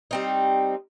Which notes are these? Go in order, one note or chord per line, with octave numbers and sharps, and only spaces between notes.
G3 C4 D#4